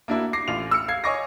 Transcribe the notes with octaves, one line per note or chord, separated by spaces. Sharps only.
A#3 D4 E4 F#4
D6 A#6 C7
A1 F4 F7
E6 F6 C#7
F5 G#6 C7
C#5 D#5 G#5 C#6 D6 A#6